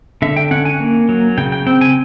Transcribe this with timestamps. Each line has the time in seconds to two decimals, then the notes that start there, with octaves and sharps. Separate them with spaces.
0.22 D3 E5
0.36 G5
0.51 C#4 F#5
0.65 G#5
0.80 A#3
1.09 F#3
1.38 C#3 G5
1.52 G5
1.67 C4 G5
1.81 G#5